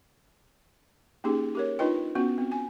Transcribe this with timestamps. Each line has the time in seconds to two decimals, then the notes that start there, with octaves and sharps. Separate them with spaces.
1.24 A#3 C#4 D#4 G4 G#4
1.55 G4 A#4 C#5
1.79 D4 D#4 F4 B4 D#5 G5
2.15 B3 C#4 F#4
2.38 C4
2.52 G#5